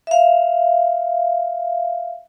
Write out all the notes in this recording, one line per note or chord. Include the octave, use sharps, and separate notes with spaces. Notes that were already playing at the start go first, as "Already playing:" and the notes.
E5 F5